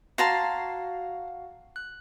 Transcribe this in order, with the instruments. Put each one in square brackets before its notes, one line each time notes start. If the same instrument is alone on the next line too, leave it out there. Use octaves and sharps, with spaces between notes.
[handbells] F#4 F5 F#5 [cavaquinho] A5 A#5 C6
[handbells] F#6